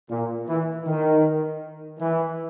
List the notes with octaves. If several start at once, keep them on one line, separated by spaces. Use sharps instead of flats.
A#2
E3
D#3
E3